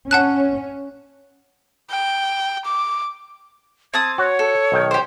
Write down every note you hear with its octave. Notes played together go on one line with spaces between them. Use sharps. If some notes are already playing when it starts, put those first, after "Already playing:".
C#4 F#5 A5 F#6
G5
D6
C4 A5 D#6 G#6
F#4 C#5
A4
B1 D#3 G5
G4 C5